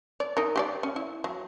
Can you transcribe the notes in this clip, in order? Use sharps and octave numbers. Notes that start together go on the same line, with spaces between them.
D5
D#4 A#4
G4 G#4 D5
C#4
E4
F#3